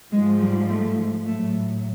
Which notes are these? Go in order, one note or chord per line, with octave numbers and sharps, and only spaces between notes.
G#2 F3 G#3
G3
A3
A2 F#3 A3